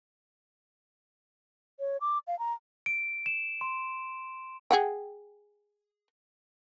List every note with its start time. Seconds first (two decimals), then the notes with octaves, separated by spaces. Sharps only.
1.80 C#5
2.01 D6
2.27 F5
2.39 A#5
2.86 D7
3.26 E7
3.61 C6
4.71 G#4 F#5 G5